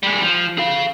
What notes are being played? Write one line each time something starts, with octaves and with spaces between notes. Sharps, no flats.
G3 G#3
F3
G#4 F5